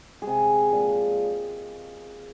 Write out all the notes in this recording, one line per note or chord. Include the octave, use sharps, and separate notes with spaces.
C3 G#3 G#4
A#2 F3 G#3